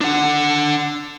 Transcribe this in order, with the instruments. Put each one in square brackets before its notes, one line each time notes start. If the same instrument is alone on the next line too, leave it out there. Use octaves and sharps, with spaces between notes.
[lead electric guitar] D4 F#5